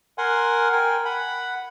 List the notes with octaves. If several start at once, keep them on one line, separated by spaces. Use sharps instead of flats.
A#4 F#5 G#5 C6
A#4 G5 G#5
F#5 B5